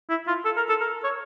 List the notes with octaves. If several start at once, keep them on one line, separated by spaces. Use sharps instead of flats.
E4
F4
A4
A#4
A4
A#4
C#5